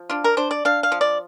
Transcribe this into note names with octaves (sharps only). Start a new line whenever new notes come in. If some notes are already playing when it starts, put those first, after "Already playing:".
Already playing: F3
D4 F4
A#4
D4 C5
D5
D4 F5
F5
F3
D5